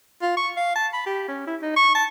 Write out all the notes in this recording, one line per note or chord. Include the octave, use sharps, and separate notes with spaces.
F4
C#6
F5
A5
B5
G4
C#4
E4
D#4
C#6
A5